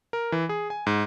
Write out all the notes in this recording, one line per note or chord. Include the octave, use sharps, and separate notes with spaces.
A#4
E3
G#4
G#5
G#2